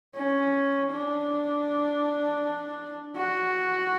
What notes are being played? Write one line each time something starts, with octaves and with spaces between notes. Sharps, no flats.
C#4
D4
F#4